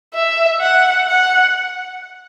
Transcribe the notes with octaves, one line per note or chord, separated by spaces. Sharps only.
E5
F#5
F#5